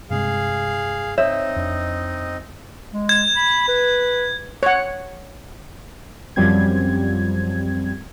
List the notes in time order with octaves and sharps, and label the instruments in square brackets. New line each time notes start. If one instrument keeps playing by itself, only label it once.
[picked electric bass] G2 C3 G#3 [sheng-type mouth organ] G#4 F5
[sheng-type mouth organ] C4 D#4 D#5 [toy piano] C#5 [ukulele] E5
[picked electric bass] F2 D4
[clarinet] G#3
[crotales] G#6
[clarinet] B5
B4
[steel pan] C#5 F#5
[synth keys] F#2 F3 G3 C4 G#6